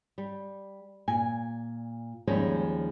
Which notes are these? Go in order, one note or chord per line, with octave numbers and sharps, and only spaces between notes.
G3
A#2 G#5
D#2 D#3 F3 G3 G#3 C#4